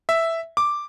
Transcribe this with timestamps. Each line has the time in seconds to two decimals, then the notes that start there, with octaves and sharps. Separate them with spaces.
0.09 E5
0.57 D6